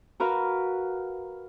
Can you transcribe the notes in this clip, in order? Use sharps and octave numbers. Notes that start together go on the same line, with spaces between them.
F#4 A#4 B4 F5